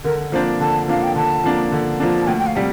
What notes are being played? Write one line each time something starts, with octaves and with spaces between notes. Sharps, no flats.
D3 A#4
F3 A#3 D4 C5
D3 A5
F3 A#3 D4 F5
G5
D3 A5
F3 A#3 D4
D3
F3 A#3 D4
A5
D2 G5
G5
F5
C3 G3